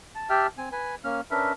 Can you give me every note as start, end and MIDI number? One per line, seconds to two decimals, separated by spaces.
0.15 0.28 81
0.30 0.47 67
0.30 0.47 76
0.30 0.47 79
0.30 0.47 81
0.30 0.47 89
0.58 0.69 60
0.58 0.69 80
0.72 0.95 71
0.72 0.95 80
1.04 1.21 58
1.04 1.21 61
1.04 1.21 89
1.31 1.53 61
1.31 1.53 62
1.31 1.53 70
1.31 1.53 71
1.31 1.53 76